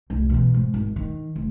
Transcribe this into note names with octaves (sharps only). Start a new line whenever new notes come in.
F1 C2
B2 E3
G#2
G#1
D#3
F1